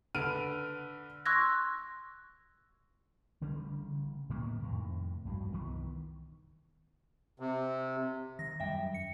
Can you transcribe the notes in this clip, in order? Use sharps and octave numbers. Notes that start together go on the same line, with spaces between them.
D3 B4 F6 D7 D#7
C6 C#6 E6 F#6 G#6 A#6
A1 C#3 G3 C#4
A2 D#3 A#3 B3
F2 A2 C3 D#3
A#1 G2 E3 F#3
C2 D#3 E3 B3
C3
D#3 A#6
F#2 G3 E5 G5
C#7